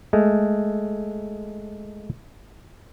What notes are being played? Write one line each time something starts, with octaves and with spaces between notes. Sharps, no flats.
G#3 A3